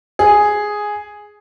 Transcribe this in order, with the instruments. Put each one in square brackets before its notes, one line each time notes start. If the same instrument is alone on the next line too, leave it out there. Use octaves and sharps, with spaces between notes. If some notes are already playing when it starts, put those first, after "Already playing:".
[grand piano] G#4